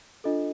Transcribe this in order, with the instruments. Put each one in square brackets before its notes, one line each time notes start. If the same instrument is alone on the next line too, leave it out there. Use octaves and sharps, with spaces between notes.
[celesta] D4 F4 A4 D#5